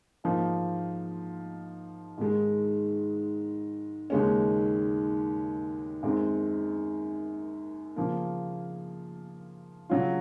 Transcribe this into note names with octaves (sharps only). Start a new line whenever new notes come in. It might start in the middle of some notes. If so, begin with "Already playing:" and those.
G#2 F3 A#3 D#4
G#2 D#3 G#3
D#2 C#3 G#3 C#4
F#2 D#3 G#3 C4
C#3 F3 A#3
C#3 F#3 C#4 F4